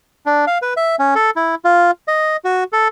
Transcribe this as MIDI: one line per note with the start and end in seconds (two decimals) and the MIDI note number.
0.26 0.45 62
0.47 0.58 77
0.62 0.74 71
0.77 0.96 76
0.99 1.14 61
1.15 1.30 69
1.36 1.55 64
1.65 1.91 65
2.08 2.37 75
2.45 2.64 66
2.73 2.88 69